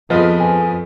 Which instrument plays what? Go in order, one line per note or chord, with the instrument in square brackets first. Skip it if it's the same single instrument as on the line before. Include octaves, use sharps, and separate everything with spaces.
[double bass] F2 [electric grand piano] F3 B4 D#5 [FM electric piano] B3 G#4 F5
[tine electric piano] G#5